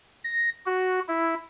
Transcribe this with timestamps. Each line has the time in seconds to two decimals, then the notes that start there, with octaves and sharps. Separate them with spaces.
0.24 A#6
0.66 F#4
1.08 E4